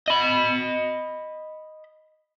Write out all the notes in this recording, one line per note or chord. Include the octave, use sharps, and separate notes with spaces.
D#5 B5